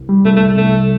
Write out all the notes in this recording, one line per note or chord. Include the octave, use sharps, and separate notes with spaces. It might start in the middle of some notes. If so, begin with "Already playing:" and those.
Already playing: C2
G3
C2 A3
A3
C3
C2 A3